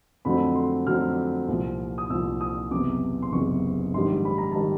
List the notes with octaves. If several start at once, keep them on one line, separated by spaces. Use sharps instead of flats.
F2 D3 F#3 A3 C4 B5
C6
F2 D3 F#3 A3 C4 F6
C2 A#2 F3
D#6
C2 A#2 F3 E6
D#6
F#1 E2 C3 D6
C6
F#1 E2 C3 C#6
A#1 G#2 D#3 G3 C6
B5
A#5
D#3 G3 A5